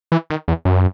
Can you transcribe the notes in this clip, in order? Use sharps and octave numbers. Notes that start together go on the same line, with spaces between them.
E3
D#3
E2
F#2